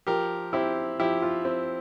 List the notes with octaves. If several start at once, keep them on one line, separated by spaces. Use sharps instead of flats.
F3 G4 A#4
C4 E4 G4
F3 E4 G4
F4
C4